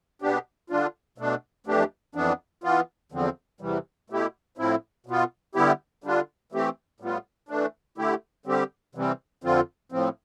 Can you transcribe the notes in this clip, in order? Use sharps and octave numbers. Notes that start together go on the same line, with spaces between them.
B2 B3 D4 G4
D3 G3 D4 F4
B2 A3 D4
F2 E3 A3 D4 G4
F2 E3 B3 D4
E3 B3 F4
E2 D3 F3 C4
E2 C3 E3 G3
B2 A3 E4 G4
A2 F3 C4 E4
B2 B3 F4
D3 G3 B3 E4 G4
D3 G3 D4 F4
E3 A3 C4 G4
A2 G3 B3 F4
E3 A3 D4
D3 A3 E4 G4
D3 G3 C4 G4
C3 E3 G3 C4
F2 D3 F3 C4 F4
A2 F3 C4